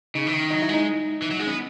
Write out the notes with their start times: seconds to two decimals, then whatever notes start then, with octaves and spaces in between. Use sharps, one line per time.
0.15 C#3 D#4
0.27 E3
0.33 D#3
0.50 F#3 D#4
0.62 E4
0.69 G#3
0.74 D#4
1.22 E3
1.31 F#3
1.39 G#3
1.47 B3 C#4